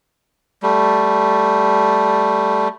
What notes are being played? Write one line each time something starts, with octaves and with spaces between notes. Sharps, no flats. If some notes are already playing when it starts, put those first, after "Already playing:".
G3 A3